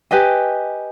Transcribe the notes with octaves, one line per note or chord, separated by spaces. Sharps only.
G4 B4 D#5 G#5